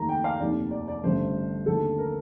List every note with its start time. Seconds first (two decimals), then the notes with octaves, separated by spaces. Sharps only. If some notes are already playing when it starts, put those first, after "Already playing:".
Already playing: D#2 D#3 A3 A#5
0.09 G5
0.24 F5
0.40 F1 D#2 D#3 A3 D5
0.71 D5
0.88 D5
1.04 A1 G2 D3 A3 C5
1.66 D#2 D3 A3 A4
1.98 A#4